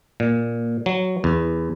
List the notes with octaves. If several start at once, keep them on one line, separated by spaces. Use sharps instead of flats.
A#2
F#3
E2